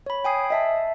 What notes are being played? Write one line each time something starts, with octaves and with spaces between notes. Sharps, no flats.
C#5 B5
G5 G#5 D#6 C7
D#5 E5 A5